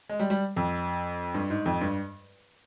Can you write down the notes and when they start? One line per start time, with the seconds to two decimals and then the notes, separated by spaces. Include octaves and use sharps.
0.09 G#3
0.19 G3
0.30 G3
0.56 F2
1.34 G2
1.50 G#2
1.66 F2
1.81 G2